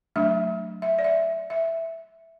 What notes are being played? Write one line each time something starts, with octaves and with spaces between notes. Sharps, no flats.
F#3 A3 D4 E5
E5
D5
E5
E5